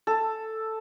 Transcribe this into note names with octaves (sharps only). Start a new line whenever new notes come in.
A4